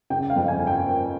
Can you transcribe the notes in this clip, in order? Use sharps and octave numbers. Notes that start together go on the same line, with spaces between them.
C#3 G5
F5
F2
G#5
F3
G5
A#3